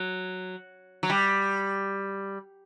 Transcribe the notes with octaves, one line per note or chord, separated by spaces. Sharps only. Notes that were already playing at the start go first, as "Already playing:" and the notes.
Already playing: F#3
F#3
G3